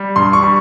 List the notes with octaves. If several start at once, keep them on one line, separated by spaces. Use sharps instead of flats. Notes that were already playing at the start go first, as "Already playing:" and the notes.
Already playing: G3
G2 C6
C#6
G3